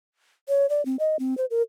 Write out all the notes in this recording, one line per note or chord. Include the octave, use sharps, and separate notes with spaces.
C#5
D5
C4
D#5
C4
C5
A#4